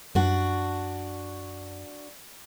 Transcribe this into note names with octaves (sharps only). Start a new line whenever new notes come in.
F#2 D4 F#4